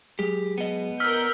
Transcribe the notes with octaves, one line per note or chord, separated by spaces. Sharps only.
F#3 G#3 G4 G#4
B3 D#5
A#4 E6 F6 G6 B6